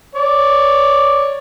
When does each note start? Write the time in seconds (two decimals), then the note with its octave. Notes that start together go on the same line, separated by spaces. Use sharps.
0.15 C#5 D5